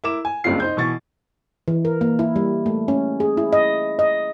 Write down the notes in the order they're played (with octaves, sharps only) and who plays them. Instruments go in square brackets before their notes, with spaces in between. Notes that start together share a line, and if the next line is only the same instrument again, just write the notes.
[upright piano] E4 A#4 D6 E7
G#5
F#1 C#2 G2 C4 F4 C7
D#4 C5 G6
B2 E3 C#6 A6
[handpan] E3
A#4
A#3
E4
G3
A3
C#4
G#4
E4
D#5
D#5